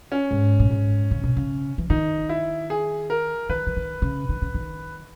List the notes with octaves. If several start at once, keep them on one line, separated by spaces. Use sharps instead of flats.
C#4
G#2
A#2
G#2
C#3
B2
C#3
E3
D#3 D#4
E4
G#4
A#4
D#3 B4
E3
D#3
C#3
D#3
C#3
D#3